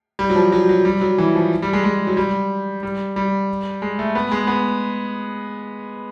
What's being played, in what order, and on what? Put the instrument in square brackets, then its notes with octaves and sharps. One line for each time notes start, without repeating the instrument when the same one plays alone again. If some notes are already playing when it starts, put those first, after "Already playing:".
[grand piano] G3
F#3
F3
F#3
F#3
G3
F#3
E3
F3
G3
G#3
G#3
F#3
G3
G3
G3
G#3
A3
B3
G#3
B3